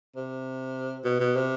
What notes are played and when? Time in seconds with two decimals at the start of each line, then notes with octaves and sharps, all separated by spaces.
0.16 C3
1.04 B2
1.20 B2
1.35 C3